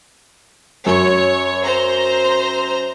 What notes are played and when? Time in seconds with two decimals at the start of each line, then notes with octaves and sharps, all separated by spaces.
0.86 F#2 C#5
1.64 C5 A#5